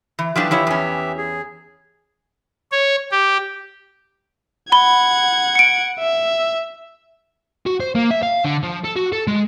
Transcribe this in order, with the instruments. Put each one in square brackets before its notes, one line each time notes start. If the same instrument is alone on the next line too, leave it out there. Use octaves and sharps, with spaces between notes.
[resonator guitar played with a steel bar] E3
[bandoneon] E3 G4 E5 [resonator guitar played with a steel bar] F3 G3 D4
[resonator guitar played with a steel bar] F3 E4 C#5
E2 C#4
[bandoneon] G#4
[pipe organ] C#5
G4
[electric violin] F#5 G#6 [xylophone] B5 G7
[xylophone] C#7 D7
[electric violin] E5
[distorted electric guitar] F#4
C5
A#3
E5
F5
D3
F3
A4
F#4
A4
G#3